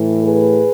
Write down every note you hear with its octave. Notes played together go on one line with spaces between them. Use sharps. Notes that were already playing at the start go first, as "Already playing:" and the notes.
Already playing: A2 E3
G#4 B4